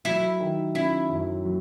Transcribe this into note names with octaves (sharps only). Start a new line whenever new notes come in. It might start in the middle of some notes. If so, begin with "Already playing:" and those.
F#3 E4
D#3
C#4 E4
F#2
F#3